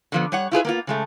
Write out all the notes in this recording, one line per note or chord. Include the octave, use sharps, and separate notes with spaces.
D3 F3 B3
G3 C#5 F#5
E4 F4 G#4 B4
A#3 B3 F4
C#3 G#3 A3